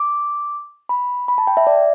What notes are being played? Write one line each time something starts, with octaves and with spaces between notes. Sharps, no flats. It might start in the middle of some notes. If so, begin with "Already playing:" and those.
Already playing: D6
B5
B5
A5
G5
E5
D5